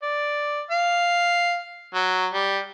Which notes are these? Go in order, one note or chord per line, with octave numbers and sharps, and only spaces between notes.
D5
F5
F#3
G3